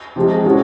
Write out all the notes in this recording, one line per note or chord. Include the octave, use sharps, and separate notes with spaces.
C3 F3 G#3
F3 G#3 C#4 F#4